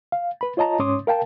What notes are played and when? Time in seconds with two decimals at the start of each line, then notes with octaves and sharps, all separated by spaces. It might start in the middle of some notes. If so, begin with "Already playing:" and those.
0.12 F5
0.41 B4 B5
0.57 F4 C#5 D#5 A5 A#5
0.79 G#2 C#4 C#5 C6 D6 D#6
1.07 A#4 F5 G5 A5